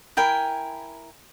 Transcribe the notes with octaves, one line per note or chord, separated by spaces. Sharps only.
E4 A#4 G5 G#5